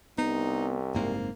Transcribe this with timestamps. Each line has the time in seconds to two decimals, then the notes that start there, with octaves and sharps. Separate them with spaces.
0.18 C2 B3 D#4
0.95 F#1 G#2 A#3 C4